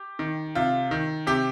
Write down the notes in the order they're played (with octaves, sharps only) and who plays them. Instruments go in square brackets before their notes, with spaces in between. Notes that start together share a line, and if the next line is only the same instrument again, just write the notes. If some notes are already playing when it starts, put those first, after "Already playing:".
Already playing: [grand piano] G4
D#3
C3 F4
D#3
C3 G4